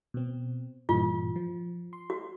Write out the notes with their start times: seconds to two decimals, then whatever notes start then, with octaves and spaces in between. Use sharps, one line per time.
0.14 B2 C4
0.89 G2 A#2 E3 F4
1.36 F3
1.93 C6
2.10 F#4